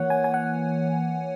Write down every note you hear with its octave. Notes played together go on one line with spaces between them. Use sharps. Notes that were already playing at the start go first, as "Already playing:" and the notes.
Already playing: E3 A#3 C#5 F#5
G#5
G#5
F#5